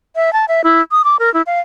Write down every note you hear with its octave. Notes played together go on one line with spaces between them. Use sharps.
E5
A5
E5
E4
D#6
D6
A#4
E4
F5